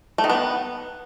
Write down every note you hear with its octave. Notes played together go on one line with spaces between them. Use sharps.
A3
D#3
B3